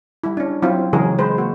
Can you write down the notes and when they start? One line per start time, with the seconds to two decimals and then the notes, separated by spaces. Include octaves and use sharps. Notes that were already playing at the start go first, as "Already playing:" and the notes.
0.24 G3 E4
0.37 C#4 D4
0.62 F#3 C4 E4 F4
0.93 C#3 E3 F#3 G#3 G#4 A#4
1.19 G#3 B4 C5
1.38 A#3 F#4